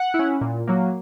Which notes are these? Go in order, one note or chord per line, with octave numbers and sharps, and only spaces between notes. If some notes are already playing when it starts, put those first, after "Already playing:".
Already playing: F#5
E4
C#4
A#2
F#3 A#3